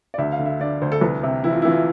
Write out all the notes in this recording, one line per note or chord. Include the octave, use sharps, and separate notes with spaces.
D5
D2 E5
F5
D3
E5
D3 D5
D2 C5
A4
C2 B4
C3
E3 E4
F4
E3 E4
F4